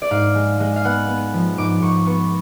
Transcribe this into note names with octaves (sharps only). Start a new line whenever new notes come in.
D5
G#2 F5
G#3
G#3
F5
B3 F#5
B3
F3
G#2 D6
G#2 C#6
B3 C#6